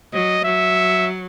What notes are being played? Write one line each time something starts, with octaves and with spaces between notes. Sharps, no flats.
F#3 D#5
F#3 E5